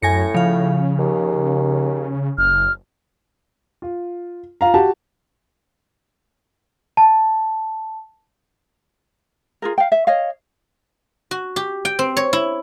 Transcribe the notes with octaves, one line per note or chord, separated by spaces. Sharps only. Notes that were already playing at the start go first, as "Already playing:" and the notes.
F#2 A2 G#5 A#6 C#7
C#3 F3 F5
D#2
F#1 F6
F4
F4 F5 A#5
F#4 G4 A5
A5
F4 G#4 A#4
F5 G5
E5
C#5 D#5 F5
F#4
G4
G5
C4
C#5
E4